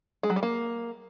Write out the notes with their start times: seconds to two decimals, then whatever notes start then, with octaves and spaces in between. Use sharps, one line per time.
0.23 G#3
0.30 F#3
0.36 G3
0.43 A#3